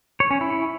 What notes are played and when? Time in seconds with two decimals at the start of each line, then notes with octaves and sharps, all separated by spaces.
0.20 C#5
0.31 C#4
0.41 E4